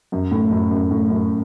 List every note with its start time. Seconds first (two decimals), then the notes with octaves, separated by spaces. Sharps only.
0.12 F#2
0.31 A2
0.51 F#2
0.71 F#2
0.91 A2
1.10 F#2